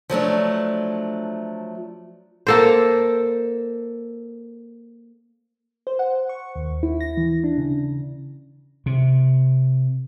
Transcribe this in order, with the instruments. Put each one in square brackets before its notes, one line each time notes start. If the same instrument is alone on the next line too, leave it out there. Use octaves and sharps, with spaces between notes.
[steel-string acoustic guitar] F3 F#3 A3 D4
[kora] A#3 A4 C5
[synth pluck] C5
F#5
C#6
D#2
E4
A#6
E3
D4
C#3
[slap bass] C3